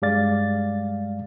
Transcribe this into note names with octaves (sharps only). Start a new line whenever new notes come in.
G2 G3 G#3 D5 F5 A6